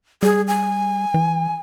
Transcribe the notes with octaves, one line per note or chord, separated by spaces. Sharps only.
G3 G#4
G#5
E3